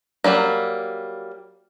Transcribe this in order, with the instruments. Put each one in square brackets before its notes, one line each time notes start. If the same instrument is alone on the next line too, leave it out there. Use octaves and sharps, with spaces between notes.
[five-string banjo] F#3 G3 A#3